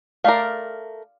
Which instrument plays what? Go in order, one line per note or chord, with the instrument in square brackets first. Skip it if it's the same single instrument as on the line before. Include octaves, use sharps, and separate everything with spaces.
[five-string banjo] A3 A#4 [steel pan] D5 F5